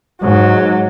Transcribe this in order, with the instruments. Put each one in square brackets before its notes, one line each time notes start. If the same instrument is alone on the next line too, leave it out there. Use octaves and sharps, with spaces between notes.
[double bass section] G#2 [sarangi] F#3